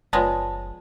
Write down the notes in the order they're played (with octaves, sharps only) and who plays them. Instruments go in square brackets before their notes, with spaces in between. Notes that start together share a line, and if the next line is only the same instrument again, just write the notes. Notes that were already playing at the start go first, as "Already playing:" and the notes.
[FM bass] F#1 [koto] F3 G#3 B3 [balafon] F4 C#5 D5 [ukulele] A5